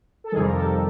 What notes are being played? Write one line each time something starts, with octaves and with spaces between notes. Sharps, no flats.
A4
F2 C3 D#3 G3 G#4 A#4
A#4
G4 A4